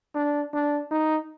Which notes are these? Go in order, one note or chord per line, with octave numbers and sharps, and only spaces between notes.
D4
D4
D#4